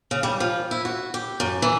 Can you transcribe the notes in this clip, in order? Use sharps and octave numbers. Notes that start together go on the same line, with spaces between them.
C#3
G3
F3
E4
F#4
G4
F#2
E3